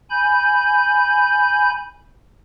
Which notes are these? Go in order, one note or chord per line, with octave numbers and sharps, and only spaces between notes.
G#5 B5 G6